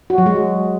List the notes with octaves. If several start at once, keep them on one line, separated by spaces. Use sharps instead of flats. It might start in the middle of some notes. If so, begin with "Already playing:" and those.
F#4
F#3
G#3